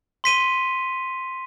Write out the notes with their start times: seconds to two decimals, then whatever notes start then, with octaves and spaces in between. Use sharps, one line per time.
0.24 C6 B6 D#7 G7